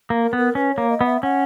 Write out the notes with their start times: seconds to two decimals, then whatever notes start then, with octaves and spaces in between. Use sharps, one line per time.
0.10 A#3
0.22 A#4
0.33 B3
0.38 A#4
0.55 C#4 B4
0.73 A#3 C#5
0.89 D#5
1.01 B3
1.06 E5
1.23 C#4 F#5